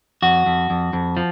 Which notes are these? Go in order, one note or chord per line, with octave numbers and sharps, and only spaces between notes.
F2 F#4
F2
F2
F2
F3